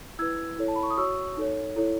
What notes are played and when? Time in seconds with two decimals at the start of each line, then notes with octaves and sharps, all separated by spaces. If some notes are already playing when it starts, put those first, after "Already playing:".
0.19 E4 B4 E6 G#6
0.58 E4 A4 C#5
0.68 A5
0.75 B5
0.83 C#6
0.90 D#6
0.97 F#4 C#5 C#6 E6
1.37 D#4 A4 C#5
1.76 E4 A4 C#5